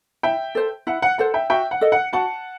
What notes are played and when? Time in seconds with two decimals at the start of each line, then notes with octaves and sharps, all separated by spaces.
0.23 E4 E5 G5
0.55 A4 C5
0.87 E4 F#5
1.02 F#5
1.18 A4 C5 F#5
1.34 E5 G5
1.50 F#4 E5 G5
1.71 F#5
1.81 A4 D#5
1.92 F#5
2.13 F#4 F#5 A5